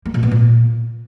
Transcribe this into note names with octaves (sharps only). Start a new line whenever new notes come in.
A#3
A#2
B3
A#2